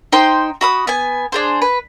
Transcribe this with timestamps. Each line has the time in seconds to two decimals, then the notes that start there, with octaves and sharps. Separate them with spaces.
0.12 D#4 C5 G5 C6
0.61 F#4 B5 D#6
0.87 B3 G#5
1.32 D4 G#4 C5
1.62 B4